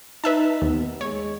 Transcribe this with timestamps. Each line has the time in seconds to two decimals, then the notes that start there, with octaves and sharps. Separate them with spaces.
0.24 D#4 B4 E5 A5
0.62 D#2 B3
1.01 G#3 C#5